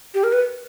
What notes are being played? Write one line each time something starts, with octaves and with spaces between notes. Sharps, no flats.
G4
A#4
B4